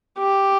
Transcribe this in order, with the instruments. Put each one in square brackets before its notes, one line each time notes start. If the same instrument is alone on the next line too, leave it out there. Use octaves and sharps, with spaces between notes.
[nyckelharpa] G4